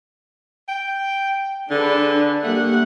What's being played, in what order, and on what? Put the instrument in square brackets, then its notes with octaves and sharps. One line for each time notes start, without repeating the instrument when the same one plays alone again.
[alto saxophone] G5
[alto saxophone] D3 [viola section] D4 G#4 B4
[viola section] G3 A#3 F#5 [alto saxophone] A3